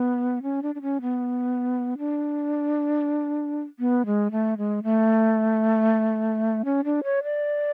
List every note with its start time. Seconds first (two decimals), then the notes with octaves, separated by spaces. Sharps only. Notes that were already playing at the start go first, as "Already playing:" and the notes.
Already playing: B3
0.42 C#4
0.63 D4
0.75 D4
0.82 C#4
1.01 B3
1.98 D4
3.79 B3
4.06 G#3
4.32 A3
4.58 G#3
4.83 A3
6.65 C#4
6.84 D4
7.04 C#5
7.23 D5